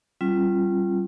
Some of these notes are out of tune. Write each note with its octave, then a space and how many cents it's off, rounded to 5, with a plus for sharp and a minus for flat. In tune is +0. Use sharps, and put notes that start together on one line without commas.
G3 -15 C#4 -45 F4 -20